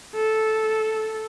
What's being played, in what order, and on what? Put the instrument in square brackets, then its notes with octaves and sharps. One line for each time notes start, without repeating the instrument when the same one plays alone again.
[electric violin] A4